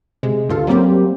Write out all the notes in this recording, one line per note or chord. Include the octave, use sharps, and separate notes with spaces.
C3 G#3
D2 G2 F4 A4
F#3 G3 A#3 C4 G4